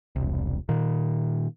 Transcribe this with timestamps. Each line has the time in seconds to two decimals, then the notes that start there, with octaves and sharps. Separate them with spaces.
0.16 E1 C2
0.69 A#2 D#3